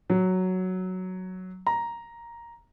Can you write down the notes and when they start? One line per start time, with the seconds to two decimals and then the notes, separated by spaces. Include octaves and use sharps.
0.10 F#3
1.67 A#5